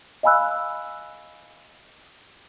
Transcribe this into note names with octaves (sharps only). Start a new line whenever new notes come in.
D#5 F5 G#5 B5 E6 F#6